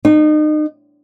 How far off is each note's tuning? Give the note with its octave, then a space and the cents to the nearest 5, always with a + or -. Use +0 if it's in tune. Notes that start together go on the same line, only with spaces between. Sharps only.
D#4 -30